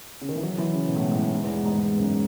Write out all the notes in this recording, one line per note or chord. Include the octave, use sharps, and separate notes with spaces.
C#3
D#3
E3
F#3
E3
C#3
B2
A2
G#2
A2
G#2
E2
G#2
G#2
E2
F#2